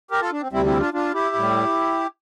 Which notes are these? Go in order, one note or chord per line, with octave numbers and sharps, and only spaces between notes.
G4 A#4
F4 A4
D4
C4
D2 C3 G3 C4 E4
C4 E4
D4 F4
D4 F4
E4 G4
A2 G3